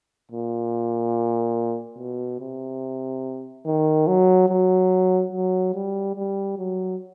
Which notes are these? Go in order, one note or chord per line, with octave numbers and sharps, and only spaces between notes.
A#2
B2
C3
D#3
F#3
F#3
F#3
G3
G3
F#3